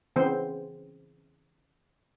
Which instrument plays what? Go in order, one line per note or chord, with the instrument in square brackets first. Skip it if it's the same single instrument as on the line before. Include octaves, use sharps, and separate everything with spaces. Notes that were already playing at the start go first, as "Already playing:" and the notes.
[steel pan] C#3 E3 B3 C4 C5